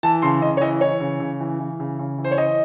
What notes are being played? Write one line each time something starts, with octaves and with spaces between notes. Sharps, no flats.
E3 A5
C#3 C6
C#3 D#5
C#5
E3 D#5
E3 C#5
C#3
C#3
E3
E3
C#3
C#3
E3
C5
C#5
E3 D#5